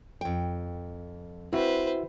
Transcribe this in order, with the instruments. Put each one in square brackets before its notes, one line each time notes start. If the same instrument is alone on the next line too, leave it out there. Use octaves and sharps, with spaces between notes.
[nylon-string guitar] F2 G5
[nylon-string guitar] C4 [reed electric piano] E4 F#4 E5 [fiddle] B4 C5